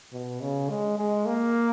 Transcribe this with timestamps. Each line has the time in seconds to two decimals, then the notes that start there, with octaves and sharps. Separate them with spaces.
0.13 B2
0.41 C#3
0.69 G#3
0.98 G#3
1.26 A#3